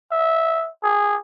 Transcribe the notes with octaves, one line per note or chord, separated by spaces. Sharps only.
E5
G#4